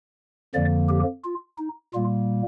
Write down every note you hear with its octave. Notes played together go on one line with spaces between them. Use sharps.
F2 D3 F3 A#3 D5
G4
F4
D#4
A#2 G3 A#3 F4